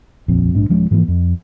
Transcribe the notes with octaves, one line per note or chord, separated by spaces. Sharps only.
D#1 A#1 F2
A#1 G#2 D4
D#1 F3 G#3 C#4
G#2 E3 F3 A#3
F2